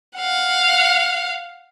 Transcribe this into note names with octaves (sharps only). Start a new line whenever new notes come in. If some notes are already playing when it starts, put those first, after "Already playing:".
F5 F#5